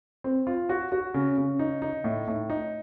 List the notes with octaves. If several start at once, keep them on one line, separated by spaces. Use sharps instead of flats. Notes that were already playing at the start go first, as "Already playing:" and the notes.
C4
F4
F#4
F#4
C#3
C#3
D#4
D#4
A2
A2
D#4